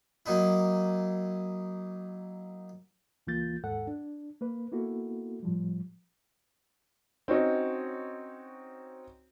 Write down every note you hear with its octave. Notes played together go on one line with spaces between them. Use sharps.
F#3 A#3 D#4 E4
C#2 E3 A#3 F4 G6 A6
D#2 G#2 A4 F#5
D4
A#3 B4
A#3 B3 E4 F#4 A4
A2 F3 G3
C4 C#4 D#4 F#4 C#5 D#5